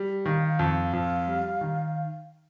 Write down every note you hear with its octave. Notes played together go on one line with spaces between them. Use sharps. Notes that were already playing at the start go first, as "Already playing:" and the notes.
Already playing: G3
D#3 F5
F5
F2
F5
F2
G3
D#3